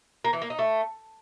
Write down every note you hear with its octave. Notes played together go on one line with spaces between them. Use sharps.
A#3
E3
A#3
D#4
A3